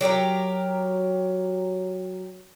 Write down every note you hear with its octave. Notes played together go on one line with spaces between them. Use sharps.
F#3 G4 A4 A#4